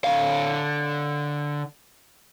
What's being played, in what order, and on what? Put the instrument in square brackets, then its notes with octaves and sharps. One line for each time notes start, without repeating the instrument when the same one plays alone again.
[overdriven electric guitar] D3 F5